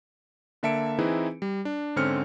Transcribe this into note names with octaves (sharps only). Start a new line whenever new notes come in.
D3 A#3 E5 A5 C#7 D7
E3 C4 D#4 E4 G#4 B4
G3
D4
G#2 D3 C4 C#4 F6 C#7